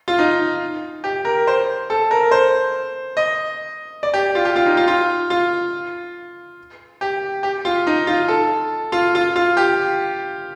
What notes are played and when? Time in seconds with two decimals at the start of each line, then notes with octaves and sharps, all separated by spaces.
0.08 F4
0.19 D#4
1.04 G4
1.25 A#4
1.47 C5
1.90 A4
2.11 A#4
2.31 C5
3.17 D#5
4.03 D5
4.14 G4
4.35 F4
4.45 G4
4.56 F4
4.66 D#4
4.77 F4
4.88 F4
5.30 F4
7.01 G4
7.43 G4
7.65 F4
7.87 D#4
8.07 F4
8.28 A4
8.92 F4
9.15 F4
9.36 F4
9.57 G4